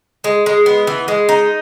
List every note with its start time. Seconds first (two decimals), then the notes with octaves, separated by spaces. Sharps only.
0.24 G#3
0.46 G#3
0.66 B3
0.87 E3
1.08 G#3
1.29 D#4